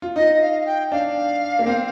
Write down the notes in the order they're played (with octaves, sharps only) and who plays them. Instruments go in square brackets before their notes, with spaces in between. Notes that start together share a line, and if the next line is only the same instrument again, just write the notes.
[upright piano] F4
[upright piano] D#4 [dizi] D#5
[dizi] D#5
F5
F5
G5
[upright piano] D4 [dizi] F5
[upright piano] A#3
C4